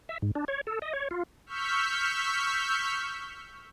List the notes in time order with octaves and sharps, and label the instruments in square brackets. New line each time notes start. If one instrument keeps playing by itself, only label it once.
[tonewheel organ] E5
G#2
D4
C#5
A4
D#5
C#5
F4
[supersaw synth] C#6 E6 F6 G6 B6